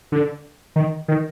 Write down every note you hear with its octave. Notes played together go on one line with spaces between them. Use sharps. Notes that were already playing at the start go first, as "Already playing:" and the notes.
D3
D#3
D#3